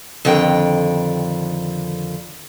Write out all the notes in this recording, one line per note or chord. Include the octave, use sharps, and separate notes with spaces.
F2 D3 D#3 G5